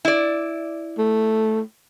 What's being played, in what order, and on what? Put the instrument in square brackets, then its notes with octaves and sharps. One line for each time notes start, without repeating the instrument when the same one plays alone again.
[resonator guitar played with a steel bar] E4 D5
[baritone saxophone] A3